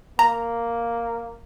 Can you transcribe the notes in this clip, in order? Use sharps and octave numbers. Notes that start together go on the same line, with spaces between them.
A#3 A#5